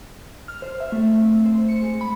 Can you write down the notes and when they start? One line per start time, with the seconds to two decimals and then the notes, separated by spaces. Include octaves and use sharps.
0.48 F6
0.62 C5
0.80 E5
0.92 A3
1.21 C4
1.46 C5
1.68 C#7
1.82 G#3
2.01 B5